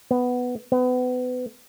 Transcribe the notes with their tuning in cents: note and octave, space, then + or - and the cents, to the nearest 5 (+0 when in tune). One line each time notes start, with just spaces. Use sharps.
B3 +5
B3 +30